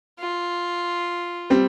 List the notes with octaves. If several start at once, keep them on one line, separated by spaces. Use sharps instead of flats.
F4
G3 C4